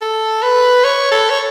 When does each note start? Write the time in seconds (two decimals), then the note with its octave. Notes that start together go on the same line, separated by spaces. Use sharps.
0.02 A4
0.43 B4
0.84 C#5
1.12 A4
1.30 C#5